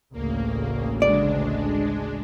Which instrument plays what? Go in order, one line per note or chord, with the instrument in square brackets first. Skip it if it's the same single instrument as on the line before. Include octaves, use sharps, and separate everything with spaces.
[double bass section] A1 D2 C#3 [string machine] A#3
[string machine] G#3 D4 [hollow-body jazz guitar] D5